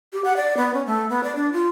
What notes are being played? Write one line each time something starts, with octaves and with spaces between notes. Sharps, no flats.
G4
F#5
D5
B3
C#4
A3
B3
D5
D4
F4